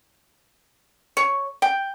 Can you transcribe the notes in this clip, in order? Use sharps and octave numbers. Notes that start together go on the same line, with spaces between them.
C#5
G5